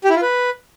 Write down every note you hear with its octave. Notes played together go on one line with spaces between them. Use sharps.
G4
E4
F4
B4